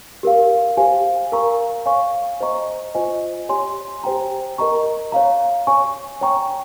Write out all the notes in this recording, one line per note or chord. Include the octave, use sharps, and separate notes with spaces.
G4 A#4 F5
G4 C5 F5 G#5
A#4 F5 A#5 C#6
C#5 F5 G#5 C#6
C5 D#5 A#5 C#6
F4 C5 D#5 G#5
G4 C#5 G#5 C6
G4 C5 G5 A#5
A#4 D#5 A#5 C#6
C#5 F5 A#5
C#5 G#5 C#6
C#5 G5 A#5 C#6